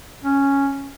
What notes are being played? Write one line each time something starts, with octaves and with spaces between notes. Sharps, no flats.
C#4